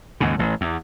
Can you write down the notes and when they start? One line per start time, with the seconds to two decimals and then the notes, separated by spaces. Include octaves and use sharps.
0.20 D#2 G#2 C#3
0.39 A1
0.61 E2